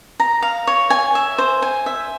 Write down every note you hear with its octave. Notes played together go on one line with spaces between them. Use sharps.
A#5
F5
C#5
G#5
E5
C5
G#5
E5